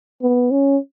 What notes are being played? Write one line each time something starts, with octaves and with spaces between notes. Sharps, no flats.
B3
C#4